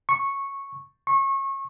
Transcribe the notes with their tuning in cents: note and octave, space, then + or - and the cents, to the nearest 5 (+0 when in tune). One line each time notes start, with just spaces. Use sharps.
C#6 -10
C#6 -30